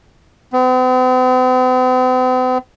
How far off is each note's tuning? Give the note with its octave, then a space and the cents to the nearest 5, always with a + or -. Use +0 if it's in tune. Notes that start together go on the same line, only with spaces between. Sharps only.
C4 -45